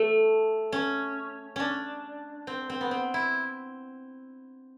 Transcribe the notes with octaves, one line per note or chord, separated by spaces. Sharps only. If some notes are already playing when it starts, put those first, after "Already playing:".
Already playing: A3
C#4
C#4 D4
C4
C4
B3
C4
E4